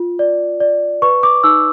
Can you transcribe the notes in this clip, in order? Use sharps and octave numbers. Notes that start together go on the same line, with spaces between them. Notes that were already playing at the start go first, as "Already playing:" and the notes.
Already playing: F4
D5
D5
B4 C#6
D6
D#4 E6